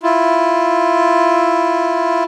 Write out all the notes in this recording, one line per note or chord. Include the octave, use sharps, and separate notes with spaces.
E4 F4